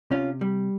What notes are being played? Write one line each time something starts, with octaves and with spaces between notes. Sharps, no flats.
C3 C#4 F4
G3